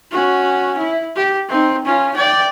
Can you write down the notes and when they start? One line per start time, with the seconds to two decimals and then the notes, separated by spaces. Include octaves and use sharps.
0.11 C#4 F#4
0.78 E4
1.16 G4
1.48 C4 D#4
1.85 C#4 F4
2.14 D5 G5